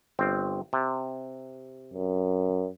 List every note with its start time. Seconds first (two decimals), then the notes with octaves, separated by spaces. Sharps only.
0.19 G1 C4
0.73 C3
1.94 F#2